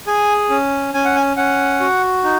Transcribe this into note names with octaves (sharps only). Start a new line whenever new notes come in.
G#4 G#5
C#4
C#4 G#5
F#5
G#5
C#4 F#5
F#4
D#4